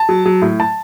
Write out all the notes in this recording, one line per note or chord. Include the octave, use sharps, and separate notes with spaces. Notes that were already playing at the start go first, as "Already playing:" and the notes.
Already playing: A5
F#3
F#3
A2
A5